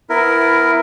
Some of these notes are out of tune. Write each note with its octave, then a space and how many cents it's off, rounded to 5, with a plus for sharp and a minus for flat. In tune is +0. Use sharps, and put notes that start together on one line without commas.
B3 +20 E4 +10 A#4 +0